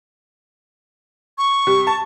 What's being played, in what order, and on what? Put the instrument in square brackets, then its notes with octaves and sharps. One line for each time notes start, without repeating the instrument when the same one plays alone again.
[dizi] C#6
[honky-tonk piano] C3 G3
A5